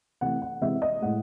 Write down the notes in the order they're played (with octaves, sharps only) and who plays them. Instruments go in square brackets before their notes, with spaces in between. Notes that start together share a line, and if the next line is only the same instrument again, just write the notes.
[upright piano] C3 E3 A3 F#5
F#5
C3 E3 G#3 E5
D#5
A2 G#3 F#5